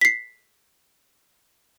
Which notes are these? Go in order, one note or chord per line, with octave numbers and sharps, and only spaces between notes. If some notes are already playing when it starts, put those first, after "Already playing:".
B6 C7